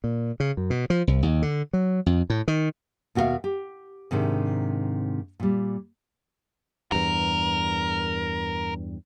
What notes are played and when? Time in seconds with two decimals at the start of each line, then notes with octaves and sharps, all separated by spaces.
0.04 A#2
0.40 C#3
0.57 F#2
0.70 B2
0.90 F3
1.07 C2
1.23 D#2
1.42 D3
1.73 F#3
2.06 F2
2.30 A2
2.48 D#3
3.15 D#2 B2 F#4 A#4 E5 F5
3.44 G4
4.11 G#2 C3 D#3 D4
5.40 A#2 G3
6.92 E2 G2 A#4